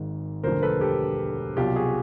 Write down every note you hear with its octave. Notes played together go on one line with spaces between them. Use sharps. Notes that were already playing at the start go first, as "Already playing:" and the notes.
Already playing: G#1 G#2 D#3
E1 D2 D3 F3 A#4 C5
A4 B4
G4 A4
C2 B2 F#3 F4 G4
F#4 G#4